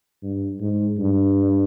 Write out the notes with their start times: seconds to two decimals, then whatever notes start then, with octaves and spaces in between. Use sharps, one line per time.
0.23 G2
0.61 G#2
0.99 G2